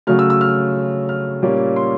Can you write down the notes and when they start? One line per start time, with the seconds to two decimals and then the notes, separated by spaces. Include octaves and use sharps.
0.07 C#3 F#3 A3 F6
0.19 E6
0.30 E6
0.41 F6
1.09 F6
1.42 A#2 G3 A#3 C#4
1.76 C6